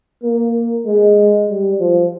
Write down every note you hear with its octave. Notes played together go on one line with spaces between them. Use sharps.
A#3
G#3
G3
F3